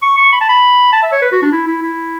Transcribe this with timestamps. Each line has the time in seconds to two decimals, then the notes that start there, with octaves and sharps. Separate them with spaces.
0.02 C#6
0.18 C#6
0.32 B5
0.41 A5
0.49 B5
0.92 A5
1.03 E5
1.12 C#5
1.22 B4
1.32 F#4
1.42 D4
1.52 E4
1.67 E4
1.82 E4